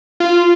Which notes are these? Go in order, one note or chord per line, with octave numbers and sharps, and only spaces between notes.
F4